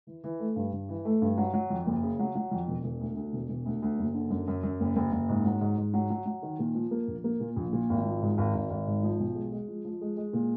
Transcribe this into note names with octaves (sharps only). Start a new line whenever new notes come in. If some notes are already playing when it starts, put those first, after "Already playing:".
E3
E3
A3
G2
G2
E3
A3
G2
F#3
F#3
F2
F#1
C#3
F#3
F#3
F2
E1
E1
D2
D2
E1
E1
D2
D2
F#1
D3
F#2
F#2
F#2
F#1
F#1
F#1
G#2
F#3
G#2
G#2
F#3
F#3
F#3
D#3
A#2
F3
A#3
A#1
A#3
A#2
A#1
A#2
G#1
F3
G#2
G#1
G#1
G#1
G#2
F3
B1
G#3
G#3
F3
F3
G#3
G#3
A#2